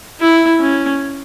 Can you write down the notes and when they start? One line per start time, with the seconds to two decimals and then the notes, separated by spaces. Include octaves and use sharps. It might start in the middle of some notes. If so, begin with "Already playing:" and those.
0.20 E4
0.60 C#4